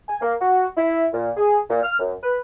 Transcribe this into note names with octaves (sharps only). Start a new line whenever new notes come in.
G#5
A#3
F#4
E4
A#2
G#4
A#2
F6
F#2
B4